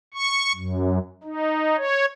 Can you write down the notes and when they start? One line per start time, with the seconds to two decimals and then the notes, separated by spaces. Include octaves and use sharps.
0.14 C#6
0.55 F#2
1.24 D#4
1.77 C#5